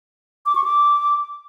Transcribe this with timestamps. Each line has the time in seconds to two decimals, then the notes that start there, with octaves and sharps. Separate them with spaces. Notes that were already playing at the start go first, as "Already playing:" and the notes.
0.46 D6
0.55 C#6
0.64 D6